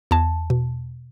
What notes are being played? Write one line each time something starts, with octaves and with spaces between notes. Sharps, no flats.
E2 A5
B2